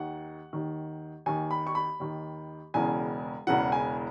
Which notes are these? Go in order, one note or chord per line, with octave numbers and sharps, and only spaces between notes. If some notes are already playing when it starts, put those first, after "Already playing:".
Already playing: D#2 D#3 F#5
D#2 D#3
D#2 D#3 G#5
B5
C#6
B5
D#2 D#3
E1 E2 C#3 E3 G#5
E1 E2 C#3 E3 F#5
G#5